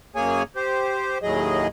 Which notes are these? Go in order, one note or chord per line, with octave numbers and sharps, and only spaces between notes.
F#2 A#3 G#4 C#5 G#5
G4 C5
D#2 A2 F#3 G#4 D#5